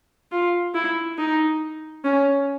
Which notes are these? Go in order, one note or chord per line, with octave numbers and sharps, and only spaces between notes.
F4
E4
D#4
C#4